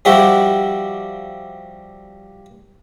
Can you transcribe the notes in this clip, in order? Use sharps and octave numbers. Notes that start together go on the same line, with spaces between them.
F3 G3 E4 F#4 G4